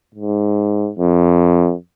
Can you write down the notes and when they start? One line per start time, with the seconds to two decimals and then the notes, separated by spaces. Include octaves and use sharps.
0.15 G#2
0.99 F2